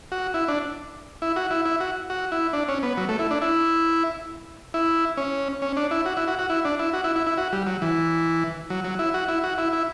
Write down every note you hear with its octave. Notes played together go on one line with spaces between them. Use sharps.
F#4
E4
D4
E4
F#4
E4
E4
F#4
F#4
E4
D4
C#4
B3
F#3
A3
E4
D4
E4
E4
C#4
C#4
D4
E4
F#4
E4
F#4
F#4
E4
D4
E4
F#4
E4
E4
E4
F#4
G3
F#3
E3
F#3
F#3
E4
F#4
E4
F#4
E4
E4